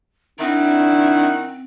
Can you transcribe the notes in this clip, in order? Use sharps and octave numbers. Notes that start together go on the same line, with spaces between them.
D#3 C4 D4 E4 F#5